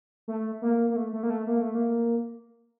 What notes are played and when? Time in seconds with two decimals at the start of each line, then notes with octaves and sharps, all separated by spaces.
0.28 A3
0.62 A#3
0.90 A#3
0.96 A3
1.13 A3
1.23 A#3
1.30 A3
1.47 A#3
1.62 A3
1.75 A#3